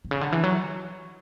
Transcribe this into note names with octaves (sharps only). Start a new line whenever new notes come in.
B2
C#3
D3
E3
F#3